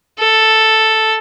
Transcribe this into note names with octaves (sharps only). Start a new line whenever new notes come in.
A4